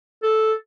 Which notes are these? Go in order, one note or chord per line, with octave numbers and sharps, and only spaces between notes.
A4